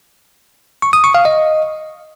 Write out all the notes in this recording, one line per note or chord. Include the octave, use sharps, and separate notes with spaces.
C#6
D#6
C#6
F5
D#5